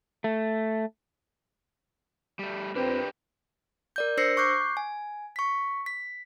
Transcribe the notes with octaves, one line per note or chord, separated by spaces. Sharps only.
A3
G3 A3
F2 C4 D4 G4 A#4 B4
A#4 D5 G6
D4 C5 E6 A#6 C7 C#7
C#6 D6 F#6 G6 C7
G#5
C#6 B6
B6